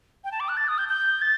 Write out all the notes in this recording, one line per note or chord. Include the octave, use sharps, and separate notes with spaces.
G5
A5
D6
F#6
A6
D#6
G6
G6
A6